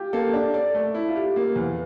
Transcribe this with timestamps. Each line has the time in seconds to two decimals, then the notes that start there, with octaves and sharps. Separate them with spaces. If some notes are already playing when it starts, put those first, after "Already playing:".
Already playing: F4 G4
0.13 A#3 A4
0.34 D4
0.54 A4 D5
0.75 A3
0.95 E4
1.08 F4
1.16 G4
1.22 F4
1.36 A#3
1.56 E2